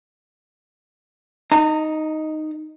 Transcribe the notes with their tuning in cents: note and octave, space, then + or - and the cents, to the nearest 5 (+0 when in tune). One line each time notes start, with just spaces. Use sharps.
D#4 +0 A#5 -35